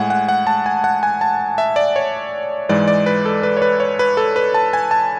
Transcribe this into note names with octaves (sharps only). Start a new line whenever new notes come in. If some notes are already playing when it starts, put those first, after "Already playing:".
Already playing: A2 G#3 F#5 G#5
F#5
F#5
A5
G#5
F#5
G#5
A5
E5
D5
C#5
G#2 E3 G#3 D5
D5
B4
A4
B4
C#5
B4
C#5
B4
A4
B4
A5
G#5
A5